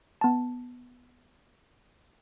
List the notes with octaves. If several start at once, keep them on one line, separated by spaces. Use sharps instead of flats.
B3 A5